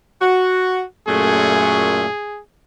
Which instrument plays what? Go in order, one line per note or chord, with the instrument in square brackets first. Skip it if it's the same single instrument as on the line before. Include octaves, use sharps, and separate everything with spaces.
[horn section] F#4
[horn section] F#2 A#2 A3 [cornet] G#4